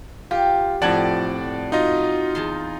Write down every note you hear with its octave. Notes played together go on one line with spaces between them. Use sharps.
F4 G4
F2 A2 F3 D5 F#5 A5 G#6 F#7
D#4 F4 F#4 D#5
E2 A5 C6